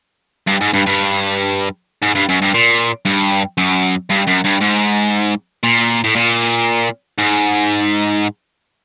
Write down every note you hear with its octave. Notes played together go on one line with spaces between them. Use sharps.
G2
G#2
G2
G2
G#2
G2
F#2
G2
A#2
G2
F#2
G2
F#2
G2
G#2
A#2
A2
A#2
G#2